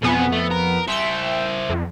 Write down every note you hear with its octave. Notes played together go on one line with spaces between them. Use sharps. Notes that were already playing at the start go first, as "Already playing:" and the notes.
F2 B2 B3 G#4
A3
A#4
E4 C5 E5 G5 E6
F2